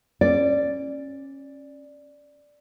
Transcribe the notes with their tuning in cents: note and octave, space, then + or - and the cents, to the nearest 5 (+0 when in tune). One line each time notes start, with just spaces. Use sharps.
C#4 -20 D5 +0